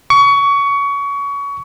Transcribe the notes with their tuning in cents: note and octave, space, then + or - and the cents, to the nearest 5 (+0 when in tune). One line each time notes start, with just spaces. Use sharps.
C#6 +25